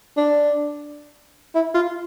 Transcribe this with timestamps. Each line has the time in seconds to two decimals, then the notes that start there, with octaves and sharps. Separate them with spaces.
0.17 D4
1.55 E4
1.75 F4